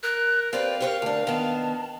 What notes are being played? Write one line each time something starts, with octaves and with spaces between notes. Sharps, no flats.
A#4 F#6
C4 G4 B4 D5 F5
G4 A#4 B4 C#5
D2 D4
D#3 B3 A5